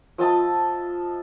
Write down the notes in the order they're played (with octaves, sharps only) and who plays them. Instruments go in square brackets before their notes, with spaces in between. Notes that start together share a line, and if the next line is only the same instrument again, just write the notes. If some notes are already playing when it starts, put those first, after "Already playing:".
[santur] F3 D#5 E5 A5